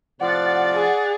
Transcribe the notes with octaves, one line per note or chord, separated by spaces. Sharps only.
A2 C3 F3 D5 F#5 A6
G#4